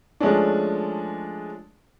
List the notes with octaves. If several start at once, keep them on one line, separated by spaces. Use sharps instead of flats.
F3 G#3 A3 C#4 D4